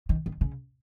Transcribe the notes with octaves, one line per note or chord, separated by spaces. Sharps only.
D#3
D#3
C#3